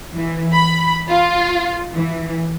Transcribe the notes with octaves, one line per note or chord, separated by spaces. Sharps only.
E3
B5
F4
E3